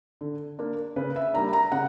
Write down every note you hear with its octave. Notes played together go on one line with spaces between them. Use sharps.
D3
A#3 D4
C#3 B4
E5
G3 A#3 D4 A#5
A#5
C#3 F#5